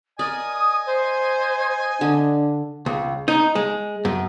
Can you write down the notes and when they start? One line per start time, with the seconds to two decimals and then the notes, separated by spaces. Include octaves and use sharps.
0.19 A#4 D5 D#5 G#5 D#6
0.87 C5
2.01 D3 D4
2.86 C#2
3.28 D#4
3.55 G#3
4.05 F#2